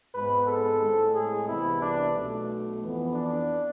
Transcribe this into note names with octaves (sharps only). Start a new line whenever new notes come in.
G#1 G#2 G#3 B3 B4
A4
A2 G#3 C4
G#4
C2 C3 E3 B3 E4
D4
B1 B2 A3
F2 E3 B3
D4